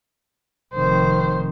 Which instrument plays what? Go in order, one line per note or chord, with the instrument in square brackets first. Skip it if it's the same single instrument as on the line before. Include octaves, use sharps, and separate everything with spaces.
[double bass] F1 D#3 [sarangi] C5